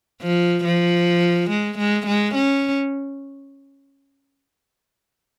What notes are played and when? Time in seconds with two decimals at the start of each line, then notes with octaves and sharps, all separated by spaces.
0.22 F3
0.65 F3
1.50 G#3
1.78 G#3
2.07 G#3
2.35 C#4